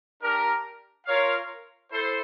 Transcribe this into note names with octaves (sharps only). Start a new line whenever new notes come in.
D4 G4 A#4
F4 A#4 C#5 F5
E4 A4 C5